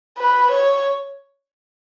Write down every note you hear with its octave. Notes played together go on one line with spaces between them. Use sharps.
B4
C#5